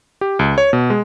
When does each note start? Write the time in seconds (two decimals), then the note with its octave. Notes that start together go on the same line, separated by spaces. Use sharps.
0.21 G4
0.39 C#2
0.58 C#5
0.73 B2
0.90 G#3